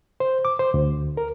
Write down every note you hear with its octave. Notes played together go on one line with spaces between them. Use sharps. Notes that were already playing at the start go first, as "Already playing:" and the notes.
C5
D6
C5
D2
A#4